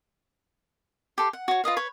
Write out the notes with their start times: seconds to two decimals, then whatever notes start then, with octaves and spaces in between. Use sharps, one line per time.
1.18 G4 A4 C6
1.33 F#5
1.48 F#4 C#5
1.64 F4 B4 D#5 F5
1.76 B4 C#5